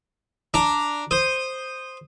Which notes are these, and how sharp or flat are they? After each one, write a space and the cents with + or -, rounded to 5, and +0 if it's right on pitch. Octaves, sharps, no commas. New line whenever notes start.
D4 +0 A#5 +0
C5 +0 D#6 -10